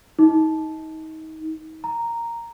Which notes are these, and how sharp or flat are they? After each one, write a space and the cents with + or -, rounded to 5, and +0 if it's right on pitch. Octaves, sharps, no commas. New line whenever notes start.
D#4 +30
A#5 -5